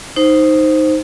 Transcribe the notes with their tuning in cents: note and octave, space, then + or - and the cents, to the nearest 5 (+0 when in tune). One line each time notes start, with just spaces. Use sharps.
D#4 +0 C5 +0